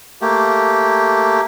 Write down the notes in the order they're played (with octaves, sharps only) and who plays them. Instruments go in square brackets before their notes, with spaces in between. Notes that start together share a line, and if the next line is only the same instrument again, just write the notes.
[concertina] A3 A#3 G4